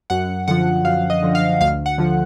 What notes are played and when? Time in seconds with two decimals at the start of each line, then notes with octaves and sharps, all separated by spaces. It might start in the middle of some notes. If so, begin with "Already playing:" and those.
0.10 F#2 F#5
0.48 D3 F3 F#5
0.85 F#2 F5
1.10 D#5
1.23 D3 F3
1.35 F5
1.61 D2 F5
1.86 F#5
1.98 D3 F3